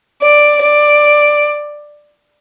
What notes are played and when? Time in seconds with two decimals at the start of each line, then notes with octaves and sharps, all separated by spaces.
0.22 D5
0.62 D5